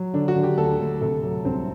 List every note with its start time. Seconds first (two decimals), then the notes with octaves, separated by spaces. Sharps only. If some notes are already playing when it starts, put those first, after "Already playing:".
Already playing: F#3
0.13 D3 D4
0.28 F#4
0.36 D3
0.43 G4
0.57 D2 A4
0.80 D2
1.01 C3 A4
1.23 F#3
1.45 C2 C4